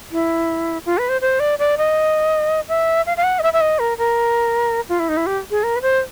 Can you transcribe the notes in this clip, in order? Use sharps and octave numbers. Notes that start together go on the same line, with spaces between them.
E4
F4
B4
C5
C5
D5
D5
D#5
E5
F5
F5
F#5
D#5
E5
E5
D#5
A#4
A#4
F4
E4
D#4
E4
G4
G#4
A#4
B4
C5